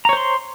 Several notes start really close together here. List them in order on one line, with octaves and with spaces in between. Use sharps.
A#5 C#5 C5 C6